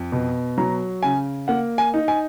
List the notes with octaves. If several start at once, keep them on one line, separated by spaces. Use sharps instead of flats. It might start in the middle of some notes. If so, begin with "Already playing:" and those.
Already playing: F2
B2
F#3 A#5
C#3 G#5
A#3 F#5
G#5
D#4
G#5